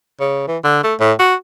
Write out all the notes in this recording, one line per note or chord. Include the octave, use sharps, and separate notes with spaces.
C#3
E3
D3
A3
A2
F#4